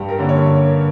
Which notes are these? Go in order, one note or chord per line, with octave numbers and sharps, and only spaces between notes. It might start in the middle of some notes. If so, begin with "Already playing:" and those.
Already playing: G2 G4
A#4
D3 A#3 C#4
C#5